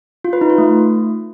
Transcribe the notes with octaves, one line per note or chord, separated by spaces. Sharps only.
F4
B4
D#4
F4
A3